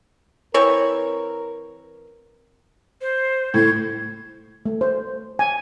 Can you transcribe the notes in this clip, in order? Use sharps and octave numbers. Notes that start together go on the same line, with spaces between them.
E3 C4 A#4 C#5
C5
A2 G#6
A3
C5
G#5